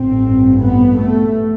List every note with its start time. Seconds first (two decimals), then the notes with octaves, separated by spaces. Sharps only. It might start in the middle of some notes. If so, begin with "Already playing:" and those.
Already playing: A1 G2 C4
0.59 B3
0.97 A3